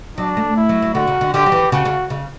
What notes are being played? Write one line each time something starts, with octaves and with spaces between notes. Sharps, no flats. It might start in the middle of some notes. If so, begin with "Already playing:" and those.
F#3 D4
A3
E4
F#3
F#3
D3 F#4
C#3
D3
D3 G4
F#3
E3
C#3 F#4
C#3
C#3